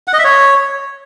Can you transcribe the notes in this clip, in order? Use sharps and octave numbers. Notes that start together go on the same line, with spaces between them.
F#5
D#5
E5
C#5